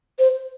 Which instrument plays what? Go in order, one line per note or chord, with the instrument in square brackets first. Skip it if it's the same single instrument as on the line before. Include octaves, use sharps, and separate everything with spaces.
[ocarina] C5